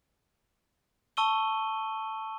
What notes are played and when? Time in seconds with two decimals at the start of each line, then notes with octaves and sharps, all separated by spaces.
1.17 A5 C#6 E6 D#7 G7